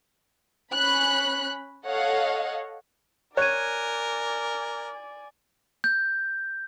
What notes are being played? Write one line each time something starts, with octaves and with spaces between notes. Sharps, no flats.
C#4 B5 F#6
A4 C#5 D#5 F5 F#5
A#4 C#5 D5 G#5 F#6 G#6 D#7
G6